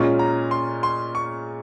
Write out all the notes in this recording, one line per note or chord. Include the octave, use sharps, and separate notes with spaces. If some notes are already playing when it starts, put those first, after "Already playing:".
Already playing: A#2 G#3 C#4 F4
A#5
C6
C6
C#6